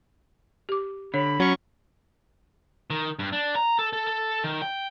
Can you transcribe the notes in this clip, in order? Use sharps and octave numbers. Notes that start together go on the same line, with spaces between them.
G4 D6
D3 C#5 B5
F#3 C#4 C#6
D#3
G2
D4
A#5
A4
A4
A4
D#3
G5